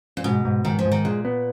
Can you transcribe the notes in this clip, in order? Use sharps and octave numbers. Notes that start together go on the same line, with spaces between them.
A#2
G#2 B2
G#2
G#2 D#3
F3
G#2
D#3
A#2 G#3
B3